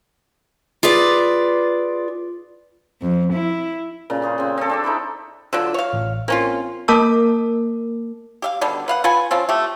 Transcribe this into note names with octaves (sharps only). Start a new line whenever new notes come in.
F4 G#4 B4 D5
F2
E4
A#2 C#3
C#4 G#4 C5
C#3 C4
C4 A4
D4 E5 D6
D#4 E4 A4 B5
D3 F#3 D4 F4 E6
C#5 F5
A1
A#3 C4 C#4 F4
A#3 A#4 A5 D6 E6
G4 E5 F5
B2 D3 D#3 G3
B4 F5 F#5
F4 B4 F#5 G#5
F3 C4 C#4 F4
A3 G4